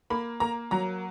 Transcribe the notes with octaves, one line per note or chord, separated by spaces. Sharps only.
A#3 B5
A#3 A#5
F#3 A#5